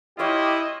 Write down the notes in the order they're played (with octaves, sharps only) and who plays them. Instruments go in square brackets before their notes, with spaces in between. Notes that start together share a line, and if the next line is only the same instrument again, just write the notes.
[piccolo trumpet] E4 [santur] F4 C#5 F5 [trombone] G4 [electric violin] D#5